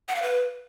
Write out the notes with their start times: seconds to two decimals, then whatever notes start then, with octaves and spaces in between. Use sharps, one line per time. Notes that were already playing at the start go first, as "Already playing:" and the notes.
0.08 F#5
0.15 F5
0.23 B4